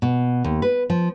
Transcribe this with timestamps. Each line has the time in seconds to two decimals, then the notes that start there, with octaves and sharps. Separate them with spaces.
0.02 B2
0.44 D#2
0.62 B4
0.90 F3